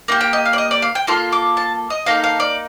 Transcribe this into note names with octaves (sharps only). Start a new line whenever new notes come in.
A#3 D#4 G4
G5
D#5
F5
D5
D#5
D5
F5
G5
A#3 F4 A4 C6
D6
A5
D#5
A#3 D#4 A4 F5
F5
D5